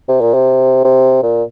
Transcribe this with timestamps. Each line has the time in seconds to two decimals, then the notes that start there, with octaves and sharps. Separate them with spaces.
0.08 C3
0.21 A#2
0.34 C3
0.84 C3
1.23 A#2